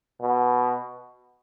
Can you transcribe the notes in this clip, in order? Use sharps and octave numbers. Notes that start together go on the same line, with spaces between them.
B2